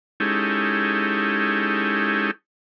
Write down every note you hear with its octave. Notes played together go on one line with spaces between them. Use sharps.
G#3 C#4 D#4 E4 G4 A4